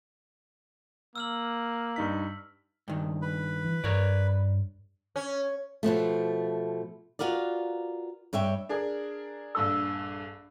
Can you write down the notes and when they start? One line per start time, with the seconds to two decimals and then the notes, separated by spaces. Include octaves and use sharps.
1.15 A#3 E6 F6 F#7
1.96 G2 D#4 B6
2.88 G2 D#3
3.22 B4
3.65 E3
3.84 G2 A#4 C#5 D5
5.16 C#4
5.83 B2 E3 F3 A3
7.19 F4 F#4 A#4 B4 D5
8.33 G2 C#5 E5 G5
8.69 D4 G#4 A#4
9.55 A#1 G2 A4 E6